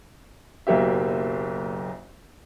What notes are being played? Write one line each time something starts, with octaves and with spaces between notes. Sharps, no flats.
F#1 B1 A#3 G4 E5